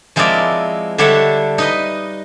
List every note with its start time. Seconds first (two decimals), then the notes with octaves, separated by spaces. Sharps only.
0.16 F3 G#3 C4 E4 A#4 D5
0.98 D3 G3 D4 C#5 E5 F#5
1.58 D#4 B4 D#5